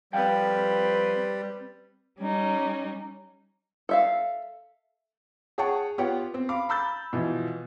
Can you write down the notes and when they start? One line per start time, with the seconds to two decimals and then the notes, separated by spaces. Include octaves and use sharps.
0.13 F2 G3 C4 B4 F5 G5
2.19 G3 C#4 D#4
3.89 A4 E5 F5
5.58 G#4 C#5 F#5 G5 A5 C#6
5.98 B3 F4 G4 C#5 F#5 G5
6.34 C4
6.49 F5 B5 D6
6.69 A#5 B5 E6 G6 A6
7.13 B2 E3 F3